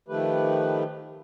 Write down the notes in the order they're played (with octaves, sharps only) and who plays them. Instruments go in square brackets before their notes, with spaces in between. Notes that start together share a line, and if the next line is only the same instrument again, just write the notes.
[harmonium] D#3 F3 A3 G4 B4